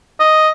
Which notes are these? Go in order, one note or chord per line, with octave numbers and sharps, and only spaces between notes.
D#5